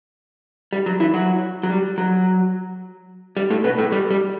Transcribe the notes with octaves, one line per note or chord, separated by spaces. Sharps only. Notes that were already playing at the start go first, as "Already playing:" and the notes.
G3
F#3
E3 E4
F#3 F#4
F#3
G3
F#3
G3
A2 A3
B2 B3
A2 A3
G3
G3